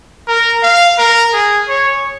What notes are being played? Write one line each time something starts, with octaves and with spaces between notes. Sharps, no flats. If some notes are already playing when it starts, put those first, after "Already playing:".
A#4
F5
A#4
G#4
C#5